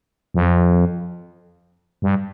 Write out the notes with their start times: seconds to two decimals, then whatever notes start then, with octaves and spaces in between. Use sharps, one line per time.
0.34 F2
2.02 G2